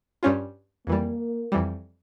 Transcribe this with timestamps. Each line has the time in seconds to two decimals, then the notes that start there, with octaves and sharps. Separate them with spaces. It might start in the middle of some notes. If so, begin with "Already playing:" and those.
0.23 G2 G3 C#4 F4
0.87 F2 E3 G3 A#3
1.52 F2 E3 G3